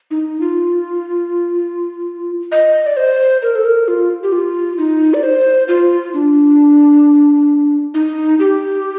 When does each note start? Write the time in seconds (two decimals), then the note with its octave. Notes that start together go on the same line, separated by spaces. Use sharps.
0.11 D#4
0.41 F4
2.52 D#5
2.86 D5
2.97 C5
3.42 A#4
3.55 A4
3.65 A#4
3.88 F4
4.23 G4
4.32 F4
4.78 D#4
5.14 D5
5.23 C5
5.68 F4
6.14 D4
7.94 D#4
8.40 G4